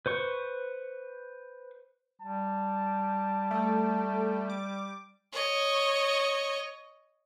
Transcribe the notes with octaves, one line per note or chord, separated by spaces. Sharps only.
B4 C5 C#6
G3 A5
A3
D6
C#5 D#5